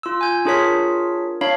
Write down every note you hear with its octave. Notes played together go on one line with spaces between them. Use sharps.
F4 E6
G#5 G6
D4 F4 G#4 A#4 C#5 B6
D4 C#5 F5 B5